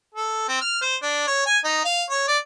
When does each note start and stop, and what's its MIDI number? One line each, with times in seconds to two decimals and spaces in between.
0.15 0.46 69
0.48 0.60 60
0.61 0.78 89
0.82 0.96 72
1.03 1.25 62
1.27 1.46 73
1.46 1.58 80
1.64 1.80 63
1.85 2.04 77
2.10 2.25 73
2.28 2.38 74